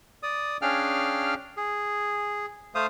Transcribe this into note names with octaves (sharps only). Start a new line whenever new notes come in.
D5 D#6
C#4 D4 G#4 F5 G5 F6
G#4
A3 C5 F5 D#6